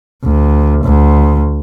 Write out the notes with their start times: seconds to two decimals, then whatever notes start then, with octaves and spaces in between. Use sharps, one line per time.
0.24 D2
0.85 D2